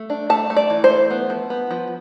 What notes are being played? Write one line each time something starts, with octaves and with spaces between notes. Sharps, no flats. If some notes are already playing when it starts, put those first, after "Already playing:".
Already playing: A3
D4
A3 A5
A3
D5
E3
C5
A3
B3
F3
B3
F3